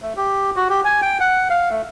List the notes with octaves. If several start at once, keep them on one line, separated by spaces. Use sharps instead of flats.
A3
G4
F#4
G4
G#5
G5
F#5
F5
A3